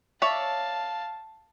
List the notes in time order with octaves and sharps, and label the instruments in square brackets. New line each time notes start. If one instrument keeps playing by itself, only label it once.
[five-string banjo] C#5 D5 E5 [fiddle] F5 A5